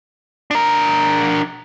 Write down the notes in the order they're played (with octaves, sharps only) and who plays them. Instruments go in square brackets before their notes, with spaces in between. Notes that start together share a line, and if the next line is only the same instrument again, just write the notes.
[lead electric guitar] D4 A#4